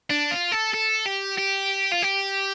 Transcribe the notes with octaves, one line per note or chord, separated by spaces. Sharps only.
D4
F4
A4
A4
G4
G4
F4
G4